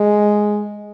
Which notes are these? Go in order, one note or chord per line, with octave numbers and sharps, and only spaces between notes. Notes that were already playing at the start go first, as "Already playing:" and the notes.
Already playing: G#3